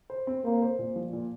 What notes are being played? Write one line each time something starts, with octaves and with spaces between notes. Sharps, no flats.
C5
C4
A#3 C5
C5
A#2
F3
A#2